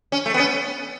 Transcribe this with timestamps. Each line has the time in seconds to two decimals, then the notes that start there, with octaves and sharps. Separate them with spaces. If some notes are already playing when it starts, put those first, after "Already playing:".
0.12 C#4
0.26 A3
0.34 B3
0.39 C#4